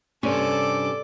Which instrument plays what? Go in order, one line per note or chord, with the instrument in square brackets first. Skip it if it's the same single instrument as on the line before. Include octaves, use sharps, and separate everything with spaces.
[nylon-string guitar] G2 C3 C#4 [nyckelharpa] A4 D6 [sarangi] D5